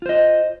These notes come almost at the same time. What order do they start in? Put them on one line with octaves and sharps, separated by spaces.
F4 C5 D#5